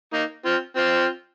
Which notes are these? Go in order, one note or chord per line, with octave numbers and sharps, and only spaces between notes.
A#3 D#4
C4 F4
C4 F4